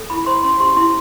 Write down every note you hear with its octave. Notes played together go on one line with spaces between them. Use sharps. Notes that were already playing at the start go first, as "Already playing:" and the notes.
Already playing: A4
E4 B5
C5 C6
C#4 C6
G4 C6
E4 C6